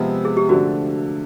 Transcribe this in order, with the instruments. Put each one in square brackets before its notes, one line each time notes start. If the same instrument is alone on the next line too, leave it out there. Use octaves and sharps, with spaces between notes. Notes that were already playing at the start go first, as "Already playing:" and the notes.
Already playing: [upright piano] C3 F3 G#3 B3
[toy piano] G#4
G4
[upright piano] D3 F3 A3 D4 [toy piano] F#4